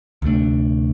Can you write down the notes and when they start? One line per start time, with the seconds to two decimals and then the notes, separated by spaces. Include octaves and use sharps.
0.22 D2 C3 A3 D4